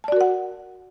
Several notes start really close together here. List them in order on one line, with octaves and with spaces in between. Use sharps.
A5 D5 F#4 A#4 F#5